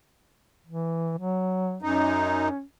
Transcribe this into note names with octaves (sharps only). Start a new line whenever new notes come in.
E3
F#3
F#2 C#4 D#4